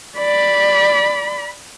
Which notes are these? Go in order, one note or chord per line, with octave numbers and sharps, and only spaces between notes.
D5 B5